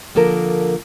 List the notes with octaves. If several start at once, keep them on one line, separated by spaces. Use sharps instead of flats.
D3 F3 A#3 A4 A#4